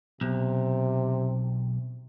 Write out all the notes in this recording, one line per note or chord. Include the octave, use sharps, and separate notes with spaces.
B1 C3